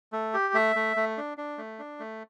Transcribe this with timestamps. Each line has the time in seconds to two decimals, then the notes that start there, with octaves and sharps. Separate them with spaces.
0.12 A3
0.34 G4
0.54 A3 E5
0.76 A3
0.97 A3
1.17 D4
1.38 D4
1.58 A3
1.79 D4
2.00 A3